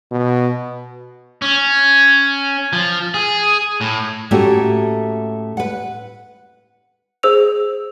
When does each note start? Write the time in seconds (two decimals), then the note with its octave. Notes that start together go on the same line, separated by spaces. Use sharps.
0.11 B2
1.42 C#4
2.73 F3
3.14 G#4
3.81 A2
4.31 A2 A3 A#3 C#4 F#4 G4
5.57 B4 F#5
7.23 G#4 C5 E6 F7